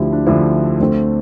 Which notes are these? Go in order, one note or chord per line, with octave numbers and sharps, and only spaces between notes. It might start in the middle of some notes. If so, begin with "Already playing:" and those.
Already playing: D2 D3 F3 E4 G4
D4
D2 D3 F3 E4
D2 D3 A3 C4